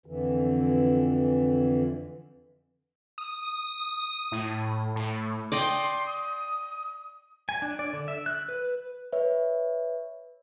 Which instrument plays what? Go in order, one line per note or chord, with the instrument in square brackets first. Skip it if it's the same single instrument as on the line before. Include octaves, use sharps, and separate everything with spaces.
[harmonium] F2 D3 E3
[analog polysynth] D#6
A2
A2
[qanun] D5 D#5 G5 [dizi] C6
[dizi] D#6
[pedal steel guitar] G#5
D4
D5
D3
E5
F#6
B4
[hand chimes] B4 C#5 E5